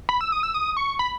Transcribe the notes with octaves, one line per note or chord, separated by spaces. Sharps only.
B5
E6
D#6
E6
D#6
C#6
B5